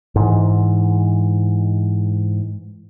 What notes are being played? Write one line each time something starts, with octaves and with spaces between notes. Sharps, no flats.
G#2 E3